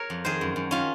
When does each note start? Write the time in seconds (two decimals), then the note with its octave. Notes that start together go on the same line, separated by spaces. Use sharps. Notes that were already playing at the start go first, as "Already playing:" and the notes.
Already playing: A#4 C#5
0.10 F2
0.25 D#3 G#4 C5
0.41 F#2
0.56 F#2
0.71 D#3 C#4 F4